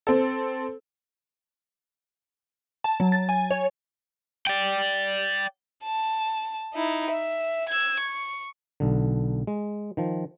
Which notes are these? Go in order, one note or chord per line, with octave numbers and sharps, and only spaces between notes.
C4 A4
A5
F#3
A6
G#5
C#5
D5 G5
A5
D#4 E4
E5
E6 G#6
C#6
B1 D3
G#3
D#3 F3